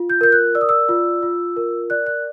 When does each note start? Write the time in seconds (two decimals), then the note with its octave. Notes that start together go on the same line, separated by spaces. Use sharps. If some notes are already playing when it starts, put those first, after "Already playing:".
Already playing: F4
0.10 G6
0.21 A#4 G6
0.32 F#6
0.55 D5 E6
0.61 D#6
0.69 E6
0.89 F4
1.22 F4
1.56 A#4
1.90 D5 F#6
2.07 F#6